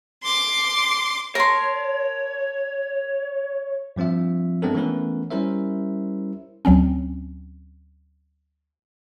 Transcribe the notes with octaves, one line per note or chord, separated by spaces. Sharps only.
C6 D6
A#4 C#5 A5 C6
G2 F3 C4 F4 E5
G#3 B3 C4 D4 A4 A#4
E3 A3 B3 C#4 A#4 B4
G3 C#4 E4 A#4 C5 E5
D2 F#3 C4 C#4